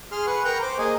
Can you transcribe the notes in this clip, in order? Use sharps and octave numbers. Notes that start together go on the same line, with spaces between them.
G#4 C6 F6
B4 F#5 C#6
A#4 G5 A#5 C#6 G6
C5 D6
A#3 G#4 D#5 G#5